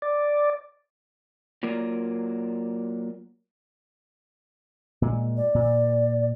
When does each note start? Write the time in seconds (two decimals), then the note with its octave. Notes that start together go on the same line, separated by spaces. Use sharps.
0.02 D5
1.63 F#3 A#3 F4 A#4 D5
5.02 A#2 G#3
5.37 D5
5.55 A#2